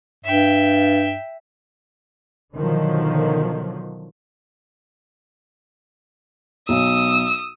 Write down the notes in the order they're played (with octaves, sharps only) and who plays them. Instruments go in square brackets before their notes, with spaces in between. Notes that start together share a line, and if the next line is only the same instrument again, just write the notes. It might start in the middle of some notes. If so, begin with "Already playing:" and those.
[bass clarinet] G2 [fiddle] E5 G5
[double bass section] B2 D3 D#3 F3 F#3
[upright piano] B1 [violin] D#6 E6